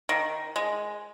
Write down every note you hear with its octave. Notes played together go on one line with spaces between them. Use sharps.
D#3
G#3